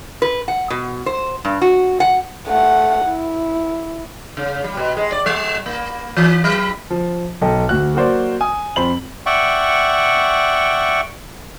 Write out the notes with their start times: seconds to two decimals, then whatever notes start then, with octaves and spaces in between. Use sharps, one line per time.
0.22 B4
0.48 F#5
0.70 B2
1.06 C5
1.45 G2
1.61 F#4
2.00 F#5
2.48 A3 F#5
3.06 E4
4.37 C#3
4.64 G3
4.77 B2
4.97 G#3
5.12 D5
5.26 G3
5.66 A#3
6.17 E3
6.44 F#3
6.91 F3
7.41 B1 A4 D#5 G5
7.69 D2 F#4 F#6
7.95 F#3 A#3 F#4 C5 D5
8.41 G#5 D#6
8.76 F2 C5 B5 F#7
9.26 D5 E5 F#5 G5 C#6